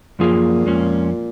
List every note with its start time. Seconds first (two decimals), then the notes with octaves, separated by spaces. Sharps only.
0.19 F#2 A#2 F3 A#3 F4 G#4
0.66 F2 F3 G#3 C#4